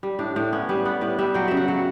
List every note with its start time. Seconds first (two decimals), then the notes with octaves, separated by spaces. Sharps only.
0.03 G3
0.19 A2 D4
0.36 A2 D4
0.53 B3 C#4
0.69 G3 B4
0.85 B3 D5
1.01 A2 B4
1.19 G3 E5
1.34 F#3 G5
1.48 C#3 E5
1.57 F#5
1.68 F#3